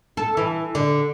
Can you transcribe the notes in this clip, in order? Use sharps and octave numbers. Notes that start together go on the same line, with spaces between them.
A4
E3
D3